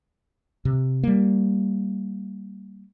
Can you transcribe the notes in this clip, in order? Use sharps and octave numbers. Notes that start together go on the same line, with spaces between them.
C3
G3 A#3